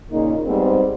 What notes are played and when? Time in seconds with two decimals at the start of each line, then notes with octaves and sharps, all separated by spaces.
0.11 A#2 C#3 A#3 D#4
0.46 G#2 G3 B3 C4